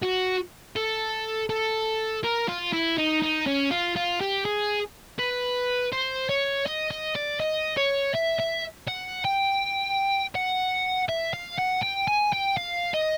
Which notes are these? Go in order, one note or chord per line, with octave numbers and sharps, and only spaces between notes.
F#4
A4
A4
A#4
F4
E4
D#4
D#4
C#4
F4
F4
G4
G#4
B4
C5
C#5
D#5
D#5
D5
D#5
C#5
E5
E5
F#5
G5
F#5
E5
F5
F#5
G5
G#5
G5
F5
D#5